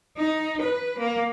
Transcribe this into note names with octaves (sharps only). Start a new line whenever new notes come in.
D#4
B4
A#3